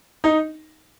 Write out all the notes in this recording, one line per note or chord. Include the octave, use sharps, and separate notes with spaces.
D#4